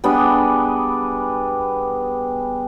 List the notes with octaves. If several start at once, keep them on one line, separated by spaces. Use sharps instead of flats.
G3 B3 D4 G#4